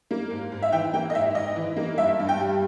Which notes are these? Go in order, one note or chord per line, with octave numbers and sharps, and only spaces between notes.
A#3
G#2
G#2
E5
E3 G5
A#3 G5
D#5
G#2 E5
G#2 D#5
E3
A#3
G2 E5
G2
G5
G3